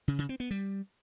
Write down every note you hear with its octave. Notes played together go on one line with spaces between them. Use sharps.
C#3
C#3
C4
B3
G3